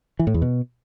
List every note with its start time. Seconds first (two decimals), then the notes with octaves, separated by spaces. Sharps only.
0.19 E3
0.27 A2
0.34 E2
0.42 B2